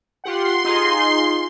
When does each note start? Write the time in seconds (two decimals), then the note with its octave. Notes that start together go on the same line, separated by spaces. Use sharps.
0.24 F4 G4 F#5 C6
0.65 D#4 F4 G#4